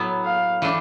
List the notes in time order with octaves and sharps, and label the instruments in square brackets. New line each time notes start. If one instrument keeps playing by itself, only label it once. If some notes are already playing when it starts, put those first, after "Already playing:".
Already playing: [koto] A2 F#3 B3
[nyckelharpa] F5
[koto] E3 A3 D4